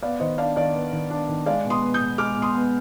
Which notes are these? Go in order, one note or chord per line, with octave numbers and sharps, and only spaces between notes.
B3 D5 F5
D#3 C5 D#5
D4 D5 F5
D#3 D5 F5
B3
D#3
D4
D#3
G#3 D5 F5
B2
C6 D#6
B3
D#6 G6
B2
G#3 D6 F6
B2
C6 D#6
B3